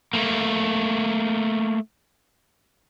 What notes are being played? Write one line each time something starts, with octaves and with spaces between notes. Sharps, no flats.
A3 A#3